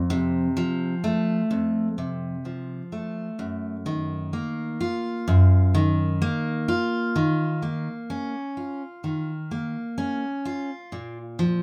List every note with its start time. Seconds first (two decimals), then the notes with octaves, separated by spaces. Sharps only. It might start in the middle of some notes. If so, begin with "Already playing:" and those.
Already playing: F2
0.10 C3
0.57 F3
1.04 A3
1.51 F2
1.98 C3
2.45 F3
2.92 A3
3.39 F#2
3.86 D#3
4.33 A#3
4.81 F4
5.28 F#2
5.74 D#3
6.22 A#3
6.68 F4
7.16 D#3
7.62 A#3
8.10 C#4
8.57 F4
9.04 D#3
9.51 A#3
9.98 C#4
10.45 F4
10.92 A#2
11.39 F3